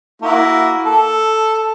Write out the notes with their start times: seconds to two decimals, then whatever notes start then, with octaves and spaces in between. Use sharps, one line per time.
0.22 A#3 E4 F#4
0.85 A4